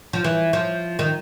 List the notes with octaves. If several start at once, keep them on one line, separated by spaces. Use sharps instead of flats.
F3
E3
F3
D#3